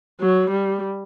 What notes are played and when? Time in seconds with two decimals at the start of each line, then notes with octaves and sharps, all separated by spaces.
0.21 F#3
0.50 G3